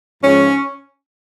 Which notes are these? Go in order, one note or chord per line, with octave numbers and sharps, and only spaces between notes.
G#2 F3 C#4